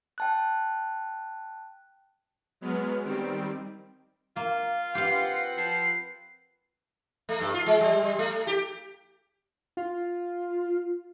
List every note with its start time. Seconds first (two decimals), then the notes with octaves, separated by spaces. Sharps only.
0.18 G5 A5 F#6
2.61 F#3 G#3 B3 F6
3.05 D#3 G3 C4 D7
4.36 A#3 F4
4.95 C4 G4 B4 F5 F#5 C7
5.57 F3 C7
7.29 A3
7.40 G2
7.54 F4
7.66 G#3
7.81 G3
8.03 G3
8.19 A3
8.47 G4
9.77 F4